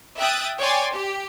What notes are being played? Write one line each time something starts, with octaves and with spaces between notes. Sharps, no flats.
E5 G5 D#6 F#6 A6
C#5 D5 G5 G#5 C6 A6
G4